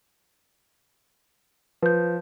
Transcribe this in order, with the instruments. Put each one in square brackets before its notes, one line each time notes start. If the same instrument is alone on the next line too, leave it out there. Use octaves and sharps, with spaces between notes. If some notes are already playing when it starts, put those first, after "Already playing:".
[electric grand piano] F3 [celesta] B4 G6